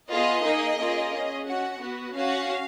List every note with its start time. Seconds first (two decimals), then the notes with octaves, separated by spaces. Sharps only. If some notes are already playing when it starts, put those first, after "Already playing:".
0.09 B3 F4 G#4 D#5
0.43 A#3 D#4 G#4
0.78 A#3 C#4 F4 G#4
1.12 C#4 G#4
1.46 C#4 F#4 F#5
1.81 B3 F#4
2.15 C#4 F#4 F5